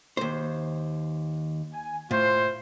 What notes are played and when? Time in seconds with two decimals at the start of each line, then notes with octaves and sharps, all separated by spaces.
0.17 D#2 C5
1.72 G#5
2.11 A2 F4 C5